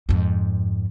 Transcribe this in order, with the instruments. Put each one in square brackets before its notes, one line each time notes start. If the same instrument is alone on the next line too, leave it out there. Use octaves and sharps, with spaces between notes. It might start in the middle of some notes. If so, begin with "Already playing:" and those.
[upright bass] F2 G#2